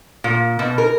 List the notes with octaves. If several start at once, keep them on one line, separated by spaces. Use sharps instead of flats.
A#2
B2
A#4